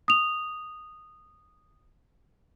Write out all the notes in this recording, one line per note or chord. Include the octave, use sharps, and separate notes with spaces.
D#6 F7